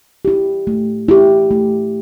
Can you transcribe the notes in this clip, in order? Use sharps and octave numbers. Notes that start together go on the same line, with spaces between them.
E4 G4
A3
E4 G4
A3